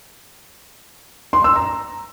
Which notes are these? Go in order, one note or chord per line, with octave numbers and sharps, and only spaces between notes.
C6
E6
A#5